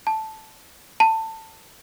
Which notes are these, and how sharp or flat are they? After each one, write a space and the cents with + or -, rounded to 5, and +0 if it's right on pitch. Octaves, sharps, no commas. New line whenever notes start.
A5 -5
A5 +20